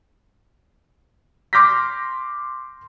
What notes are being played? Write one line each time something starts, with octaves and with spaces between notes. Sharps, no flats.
C6 D6 F6 G6 A#6 B6